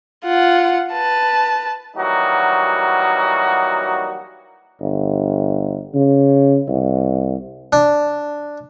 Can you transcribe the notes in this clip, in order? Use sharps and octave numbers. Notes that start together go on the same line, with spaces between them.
F4 F#5
B4 A5
E3 F#3 G3 A#3 D#4 F#4
G1
C#3
C2
D4